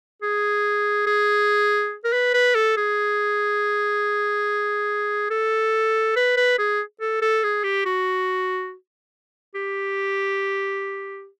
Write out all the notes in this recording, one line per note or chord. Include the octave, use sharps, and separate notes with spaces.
G#4
G#4
A#4
B4
B4
A4
G#4
A4
B4
B4
G#4
A4
A4
G#4
G4
F#4
G4